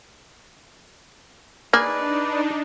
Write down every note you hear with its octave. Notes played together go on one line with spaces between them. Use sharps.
A#3 D4 D#4 G#4 B4 D5